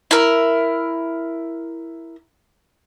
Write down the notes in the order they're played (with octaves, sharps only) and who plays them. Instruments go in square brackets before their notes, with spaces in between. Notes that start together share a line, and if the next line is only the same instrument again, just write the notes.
[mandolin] E4 A#4